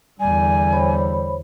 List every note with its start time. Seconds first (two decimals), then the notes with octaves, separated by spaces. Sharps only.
0.20 E2 D3 G3 G#5
0.72 C5 C#5 B5